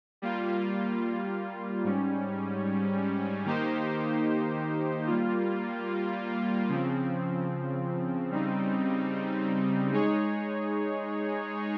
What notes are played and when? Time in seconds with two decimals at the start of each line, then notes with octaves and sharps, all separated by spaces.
0.22 G3 A#3 F4
1.84 G#2 G3 C#4
3.45 D#3 A#3 D#4 G4 C5
5.07 G3 A#3 F4
6.69 C#3 F3 C4
8.31 C#3 G3 C4 D#4
9.92 G#3 D#4 G#4 C#5